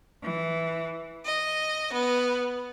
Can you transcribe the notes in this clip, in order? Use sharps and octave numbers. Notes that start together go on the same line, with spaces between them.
E3
D#5
B3